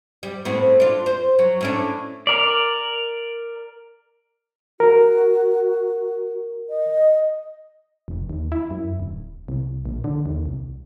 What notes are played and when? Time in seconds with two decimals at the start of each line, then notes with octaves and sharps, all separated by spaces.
0.23 G3
0.45 A2 B3 C4
0.80 D4 F4
1.06 C5
1.39 F#3
1.61 A2 C#4 D4
2.27 A#4 D5
4.80 F#4 A#4
6.69 D#5
8.08 F1
8.30 D#2
8.52 E4
8.71 F#2
9.00 D1
9.48 C2
9.85 A#1
10.04 D3
10.26 D#2
10.46 C2